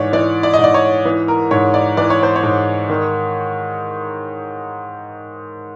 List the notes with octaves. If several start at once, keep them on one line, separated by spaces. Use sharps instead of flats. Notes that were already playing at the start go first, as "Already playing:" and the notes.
Already playing: G#2 E3 C#5 D5
E3 D5
D5
D#5
G#2
D5
C#5
E3
A#4
G#2 C#5
D5
E3 D5
C#5
C5
C#5
G#2
D#3